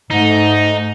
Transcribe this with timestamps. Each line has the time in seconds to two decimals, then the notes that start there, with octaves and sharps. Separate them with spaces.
0.11 G#2 A3 D#4